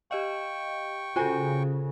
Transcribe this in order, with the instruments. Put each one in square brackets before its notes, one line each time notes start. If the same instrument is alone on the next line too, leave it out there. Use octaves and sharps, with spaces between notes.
[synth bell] G4 D#5 F5 [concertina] G5 C#6
[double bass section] C#3 [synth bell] F4 A4 [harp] F#4 C5 G#5